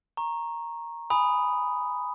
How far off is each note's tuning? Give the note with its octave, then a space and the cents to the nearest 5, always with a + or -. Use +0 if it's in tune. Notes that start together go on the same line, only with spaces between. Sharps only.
A#5 +0 C#6 -20
G#5 +0 B5 +0 D#6 +0